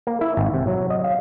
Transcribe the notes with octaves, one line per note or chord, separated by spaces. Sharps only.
A#3
E4
G#1
C3
F#3
D#5
F5